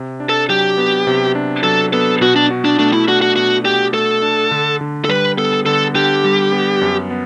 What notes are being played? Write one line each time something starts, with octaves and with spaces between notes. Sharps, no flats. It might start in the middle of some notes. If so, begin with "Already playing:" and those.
Already playing: C3
D4
A4
F#3 G4
B3
C3
D4
F#3 A4
B3 A4
B2 F#4
D4
F#4
D4
A3 D4
E4
D4 F#4
F#4
B2 F#4
F#4 G4
A3 A4
D4
D3
D3
A4
G3 B4
B3 A4
D3 A4
D3 G4
G3
B3
F#2
B3